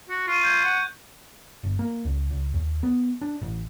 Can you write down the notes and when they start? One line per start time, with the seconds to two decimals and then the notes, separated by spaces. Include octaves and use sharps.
0.09 F#4
0.28 F4 C#6 D#7
0.43 G6 G#6
0.65 F#5
1.64 G1
1.79 A#3
2.05 C#2
2.30 C#2
2.54 D#2
2.83 B3
3.21 D4
3.42 A1